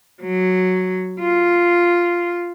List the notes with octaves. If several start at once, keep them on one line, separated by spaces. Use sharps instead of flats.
F#3
F4